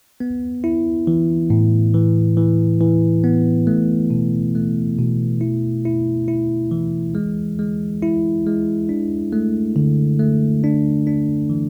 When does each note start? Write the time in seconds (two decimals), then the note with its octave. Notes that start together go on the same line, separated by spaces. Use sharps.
0.20 B3
0.64 E4
1.07 E3
1.50 A2
1.94 E3
2.37 E3
2.81 E3
3.24 B3
3.67 A3
4.10 B2
4.55 A3
4.98 B2
5.41 E4
5.85 E4
6.28 E4
6.71 E3
7.15 G#3
7.59 G#3
8.02 E4
8.46 G#3
8.89 D4
9.33 A3
9.76 D3
10.19 A3
10.64 D4
11.07 D4
11.50 E3